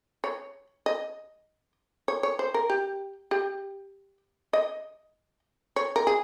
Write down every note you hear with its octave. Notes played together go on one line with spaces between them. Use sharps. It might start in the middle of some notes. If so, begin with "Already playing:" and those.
C#5
D#5
C#5
C#5
C5
A#4
G4
G4
D#5
C#5
A#4
G#4